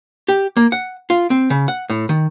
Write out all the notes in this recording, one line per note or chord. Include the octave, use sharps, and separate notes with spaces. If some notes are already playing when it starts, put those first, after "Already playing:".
G4
A#3
F#5
F4
C4
C#3
F#5
A2
D#3